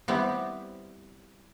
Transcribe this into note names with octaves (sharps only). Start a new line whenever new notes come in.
G3 B3 C4 E4 G4